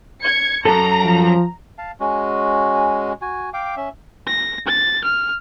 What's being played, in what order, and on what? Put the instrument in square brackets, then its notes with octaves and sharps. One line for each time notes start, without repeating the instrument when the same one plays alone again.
[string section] G#6 C#7
[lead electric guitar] F#2 [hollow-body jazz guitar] A4 [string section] A#5
[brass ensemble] F3
[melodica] F5 A5
G#3 C#4 F#4
F#4 G#5
F5 G5 D6
C#4 E5
[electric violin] A#6
A6
F6